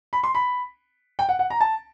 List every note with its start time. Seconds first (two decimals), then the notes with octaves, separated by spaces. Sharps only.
0.13 B5
0.23 C6
0.35 B5
1.19 G5
1.29 F#5
1.39 F#5
1.50 A#5
1.61 A5